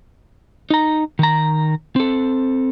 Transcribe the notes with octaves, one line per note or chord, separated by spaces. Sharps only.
D#4 A#5
D#3 A#5
C4 A4